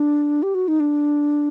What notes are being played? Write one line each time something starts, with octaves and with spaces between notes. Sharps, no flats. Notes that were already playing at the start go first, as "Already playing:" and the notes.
Already playing: D4
G4
F#4
D#4
D4